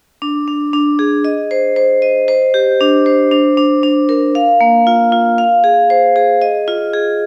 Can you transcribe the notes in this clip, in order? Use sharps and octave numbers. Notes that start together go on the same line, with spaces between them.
D4
D4
D4
G#4
D#5
C5
C5
D#5
C5
G4
D4
C5
D4
D4
D4
A#4
F5
A#3
F4
F4
F5
G#4
C5
G#4
D#5
F4
G#4